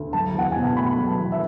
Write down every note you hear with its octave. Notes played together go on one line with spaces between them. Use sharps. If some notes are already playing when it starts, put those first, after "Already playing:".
Already playing: D2
F#3 A5
E2 F#5
B2 G#5
A5
A3 B5
F#3
A5
E2
E5